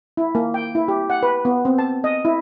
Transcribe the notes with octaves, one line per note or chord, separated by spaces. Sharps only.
E4
A#3
G5
E4
G4
F#5
B4
B3
C4
A5
D#5
E4